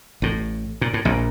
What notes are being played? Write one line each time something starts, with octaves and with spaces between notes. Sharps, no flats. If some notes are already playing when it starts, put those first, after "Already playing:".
A1 A2
A#2
A2
A#1 A#2